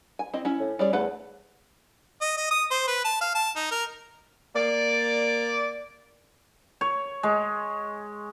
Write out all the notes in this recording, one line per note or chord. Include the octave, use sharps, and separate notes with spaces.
G#5
C4 E4 D#5
C#4 E4
A2
G3 C#4 G#4 D5
E2 A3 B4 F#5
D#5
D#5
D#6
C5
B4
A5
F5
A5
D#4
A#4
A#3 D5
C#5
G#3